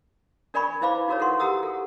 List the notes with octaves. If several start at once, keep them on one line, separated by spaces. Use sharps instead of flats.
D4 A#4 D5 G#5 B5 C#6
E4 B4 C5 F5 B5 D6
D#4 F#4 A#4 B4 C#5
A4 A#4 F#5 C6 C#6
G4 A#4 F#5 A#5 D#6 E6
A4